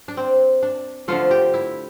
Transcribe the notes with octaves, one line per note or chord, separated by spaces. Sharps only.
D4
C4
D4
D3 F3 A3 F4
G4
E4